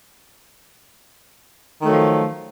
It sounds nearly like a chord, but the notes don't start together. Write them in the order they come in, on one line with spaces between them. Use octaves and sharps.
D#3 A3 F#3 F3